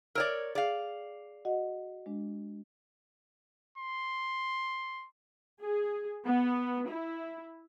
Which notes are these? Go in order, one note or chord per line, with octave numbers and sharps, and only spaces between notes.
A#4 C#5 D5 E6
G#4 D5 F5
F#4 D#5 F#5
G#3 D4
C6
G#4
B3
E4